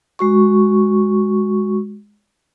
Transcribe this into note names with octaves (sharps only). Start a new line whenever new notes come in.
G#3 F#4 C#6